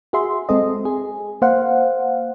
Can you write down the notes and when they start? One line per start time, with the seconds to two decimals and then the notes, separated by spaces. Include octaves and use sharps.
0.13 F#4 G#4 E5 C6
0.49 G#3 C4 A4 D#5
0.85 G#4
1.42 A#3 C5 F5 F#5